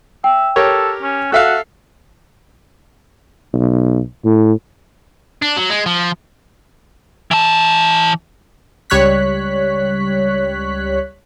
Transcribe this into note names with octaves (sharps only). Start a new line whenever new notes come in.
E5 G5
G4 A4 A#4 C#5
C#4
F#4 A4 E5 F5 F#6
B1
A2
D4
F#3
G#3
F3
E3 A5
C#2 G3 C#5 F#6 B6